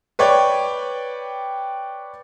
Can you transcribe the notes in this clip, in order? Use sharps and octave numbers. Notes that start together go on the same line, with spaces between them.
B4 C#5 D5 G5